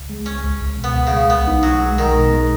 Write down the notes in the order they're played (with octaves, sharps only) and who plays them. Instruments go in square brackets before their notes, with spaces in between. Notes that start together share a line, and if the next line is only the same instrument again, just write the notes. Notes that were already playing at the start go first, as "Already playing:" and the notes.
Already playing: [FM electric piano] C#2
G#3
[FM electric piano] C#2 [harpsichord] C#4
[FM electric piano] C#2
C#2
B2
[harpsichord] B3
[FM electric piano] C#2
[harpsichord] C#3
[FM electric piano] G#3
[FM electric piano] B1 [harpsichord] B3
[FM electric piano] D#4
[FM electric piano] B1 [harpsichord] F#3
[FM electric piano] G#3
[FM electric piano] B1 [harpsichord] D#3
[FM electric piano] B2
G#3